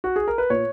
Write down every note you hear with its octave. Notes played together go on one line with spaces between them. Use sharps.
F#4
G#4
A#4
B4
A#2 C#5